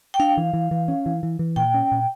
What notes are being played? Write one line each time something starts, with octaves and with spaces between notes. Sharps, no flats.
G5
D4 F5
E3
E3
E3
C#4
E3
E3
E3
A#2 G5
C#4
A#2